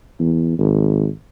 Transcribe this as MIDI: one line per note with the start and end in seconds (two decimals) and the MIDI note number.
0.20 0.56 40
0.58 1.07 32